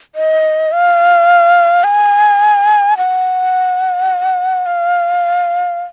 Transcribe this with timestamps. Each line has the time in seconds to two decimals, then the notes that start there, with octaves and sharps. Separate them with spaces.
0.15 D#5
0.72 F5
1.84 G#5
2.97 F#5
4.66 F5